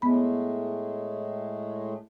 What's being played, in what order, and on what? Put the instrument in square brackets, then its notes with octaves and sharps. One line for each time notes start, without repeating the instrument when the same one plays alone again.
[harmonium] A2 G#3 A3 [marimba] B3 B5